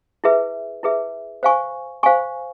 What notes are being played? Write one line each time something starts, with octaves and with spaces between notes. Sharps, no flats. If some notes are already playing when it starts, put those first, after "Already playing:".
E4 G#4 B4 E5
E4 G#4 B4 E5
C5 F5 G#5 C#6
C5 F5 G#5 C#6